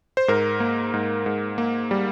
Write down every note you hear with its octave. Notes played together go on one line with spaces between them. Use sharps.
C5
G#2 A#4
A#3
G#2
G#2
A#3
G3